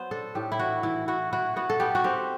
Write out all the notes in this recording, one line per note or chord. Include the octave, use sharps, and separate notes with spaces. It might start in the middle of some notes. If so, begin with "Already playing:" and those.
Already playing: F#3 B3 C5
D4 A4
A2 G4
E4
E3 F#4
E3 E4
E4 F#4
E4 F#4
B3 F#4
A4
B3 G4
F#4
C4 G4